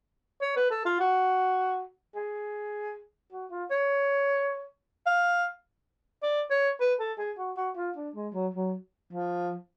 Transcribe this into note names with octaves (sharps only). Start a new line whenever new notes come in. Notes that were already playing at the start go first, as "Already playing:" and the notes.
C#5
B4
A4
F4
F#4
G#4
F#4
F4
C#5
F5
D5
C#5
B4
A4
G#4
F#4
F#4
F4
D4
G#3
F#3
F#3
F3